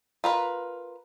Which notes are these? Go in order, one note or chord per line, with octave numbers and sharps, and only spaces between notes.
F4 A#4 B4